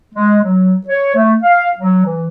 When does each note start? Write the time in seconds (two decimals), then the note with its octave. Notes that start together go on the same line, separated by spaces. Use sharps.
0.15 G#3
0.43 F#3
0.88 C#5
1.15 A3
1.43 F5
1.78 F#3
2.05 E3